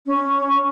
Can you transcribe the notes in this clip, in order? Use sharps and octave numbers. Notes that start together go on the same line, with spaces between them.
C#4